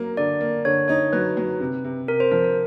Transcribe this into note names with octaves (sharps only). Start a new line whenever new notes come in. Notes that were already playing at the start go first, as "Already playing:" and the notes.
Already playing: F#3 A#3
D3 D5
A#3
D3 C#5
D#4 C#5
F#3 B4
F#3
C3
C3
C3 A#4
C5
F3 A#4
A#4